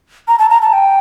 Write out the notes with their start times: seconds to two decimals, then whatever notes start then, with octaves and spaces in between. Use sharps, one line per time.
0.28 A#5
0.39 A5
0.50 A#5
0.62 A5
0.73 G5